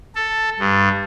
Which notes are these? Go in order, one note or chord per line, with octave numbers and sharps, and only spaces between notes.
A4
G2